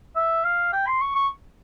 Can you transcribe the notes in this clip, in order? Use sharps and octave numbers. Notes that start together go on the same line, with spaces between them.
E5
F5
G5
C6
C#6
C#6